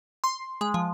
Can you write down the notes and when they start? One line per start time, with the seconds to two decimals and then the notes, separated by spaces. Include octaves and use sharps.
0.24 C6
0.61 G#3
0.74 F3